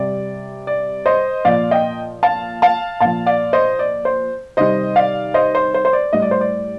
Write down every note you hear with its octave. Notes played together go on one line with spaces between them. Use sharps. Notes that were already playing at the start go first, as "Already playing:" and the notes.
Already playing: C3 G3 D5
D5
C5 D#5
A#2 F3 D5 F5
D#5 G5
F5 A5
F5 A5
A#2 F3 F5 A5
D5 F5
C5 D#5
D5
C5
C3 D#3 G3 C5 D#5
D5 F5
C5 D#5
C5
C5
C5
D5
A2 G3 D#5
D5
C5
D5